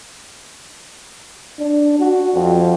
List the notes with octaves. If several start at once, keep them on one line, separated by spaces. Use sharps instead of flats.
D4
F#4
F2